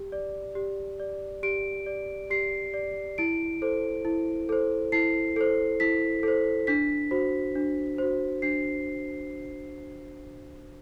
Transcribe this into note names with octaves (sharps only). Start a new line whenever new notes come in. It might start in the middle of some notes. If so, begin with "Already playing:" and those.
Already playing: G4
D5
G4
D5
G4 D7
D5
G4 C7
D5
E4 D7
A4 C5
E4
A4 C5
E4 C7
A4 C5
E4 B6
A4 C5
D4 B6
F#4 C5
D4
F#4 C5
D4 C7